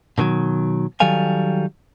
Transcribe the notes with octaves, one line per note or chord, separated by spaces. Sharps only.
B2 D3 D#3 F#3
D#3 F#3 G3 A4 F5 G#5